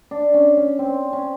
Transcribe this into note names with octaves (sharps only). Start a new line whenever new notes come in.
D4
C#4
C#4
C4
C#4